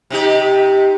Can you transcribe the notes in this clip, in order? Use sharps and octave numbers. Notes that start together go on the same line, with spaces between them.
C3 D#4 G4